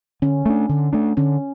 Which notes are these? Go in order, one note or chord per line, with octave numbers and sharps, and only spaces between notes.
D3 C#4
A3 D4
D3
A3 D4
D3 C#4